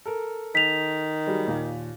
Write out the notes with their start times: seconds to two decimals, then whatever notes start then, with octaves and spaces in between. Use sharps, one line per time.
0.06 A4 A#4
0.55 D#3 B6 F7
1.27 F#3 G3 G#4
1.47 D#2 A#2